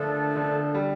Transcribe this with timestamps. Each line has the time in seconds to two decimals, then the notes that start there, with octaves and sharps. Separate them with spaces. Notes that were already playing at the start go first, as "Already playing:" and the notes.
Already playing: A#2 D3 F3 A3 D4 A4
0.36 D3
0.75 G3